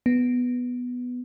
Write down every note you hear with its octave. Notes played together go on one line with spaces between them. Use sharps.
B3